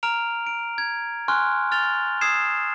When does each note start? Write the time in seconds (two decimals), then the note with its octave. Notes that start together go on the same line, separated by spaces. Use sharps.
0.03 A#5 F6 D7 F7
0.47 D7
0.78 G#6
1.28 G#5 C6 C#6 F6 F#6
1.72 F6 A6 F7 G7
2.21 D#6 E6 G#6 C7 E7